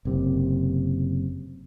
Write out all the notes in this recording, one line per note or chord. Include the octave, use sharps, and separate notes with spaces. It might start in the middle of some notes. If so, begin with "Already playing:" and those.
F#1 C3